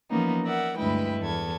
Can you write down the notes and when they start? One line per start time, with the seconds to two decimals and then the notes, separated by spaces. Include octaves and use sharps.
0.10 E3 F3 A#3 B3 C#4 D#4
0.43 A#4 D5 E5 F#5
0.77 D2 G2 G#3 E4 B4 G5
1.20 E2 A4 G#6